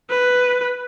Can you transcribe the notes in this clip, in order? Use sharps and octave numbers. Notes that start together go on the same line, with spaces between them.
B4